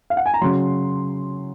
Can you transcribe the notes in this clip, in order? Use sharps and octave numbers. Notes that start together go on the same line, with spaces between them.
F5
F#5
G#5
A#5
C#3 F#3 C6